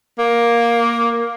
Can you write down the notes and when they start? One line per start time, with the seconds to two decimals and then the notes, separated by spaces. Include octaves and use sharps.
0.18 A#3